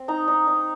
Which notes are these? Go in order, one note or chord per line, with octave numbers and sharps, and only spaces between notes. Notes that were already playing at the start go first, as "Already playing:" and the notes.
Already playing: C4
D#4 A#5
D#4
D#4